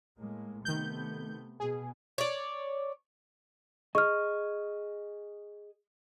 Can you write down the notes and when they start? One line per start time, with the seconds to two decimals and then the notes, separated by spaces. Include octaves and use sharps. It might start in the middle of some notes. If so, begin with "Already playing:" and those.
0.18 A2 G#3 A#3
0.65 C3 D#3 A3 B3 G6
1.60 B2 G#4
2.18 C#5 D5
3.95 G#4 D#5 C#6 F6